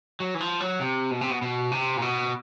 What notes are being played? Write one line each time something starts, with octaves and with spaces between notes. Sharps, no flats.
F#3
E3
F3
F#3
C3
B2
C3
B2
B2
C3
A#2
B2